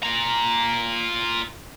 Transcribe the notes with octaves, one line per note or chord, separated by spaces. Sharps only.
F4 A#5